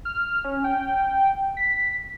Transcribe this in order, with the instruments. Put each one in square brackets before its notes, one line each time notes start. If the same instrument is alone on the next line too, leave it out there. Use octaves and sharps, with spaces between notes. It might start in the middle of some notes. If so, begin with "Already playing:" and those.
[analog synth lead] F6
C#4
G5
B6